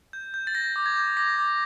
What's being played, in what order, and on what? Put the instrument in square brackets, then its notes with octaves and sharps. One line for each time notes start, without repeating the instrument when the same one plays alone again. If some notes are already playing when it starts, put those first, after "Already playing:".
[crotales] G6
G6
A6
G6 A#6
D6
G#6
G6
D6 A#6
D6